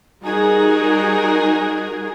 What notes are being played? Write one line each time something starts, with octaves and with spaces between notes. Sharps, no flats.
G3 D#4 F#4 G#4 A#4